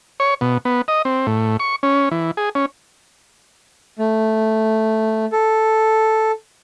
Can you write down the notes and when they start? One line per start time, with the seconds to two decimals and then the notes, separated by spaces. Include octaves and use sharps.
0.20 C#5
0.41 B2
0.65 B3
0.88 D#5
1.05 C4
1.27 A2
1.60 C#6
1.83 C#4
2.11 E3
2.37 G#4
2.55 C#4
3.99 A3
5.32 A4